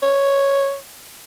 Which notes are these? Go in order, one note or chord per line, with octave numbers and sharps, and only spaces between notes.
C#5